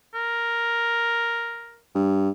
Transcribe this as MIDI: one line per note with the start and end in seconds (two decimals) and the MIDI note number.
0.14 1.81 70
1.95 2.30 43